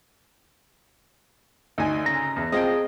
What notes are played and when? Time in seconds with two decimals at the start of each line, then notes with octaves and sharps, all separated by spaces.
1.78 D2 D#4 G#5
2.06 C#3 A#5
2.36 E2
2.52 C4 F4 G#4 D#5 G5 A5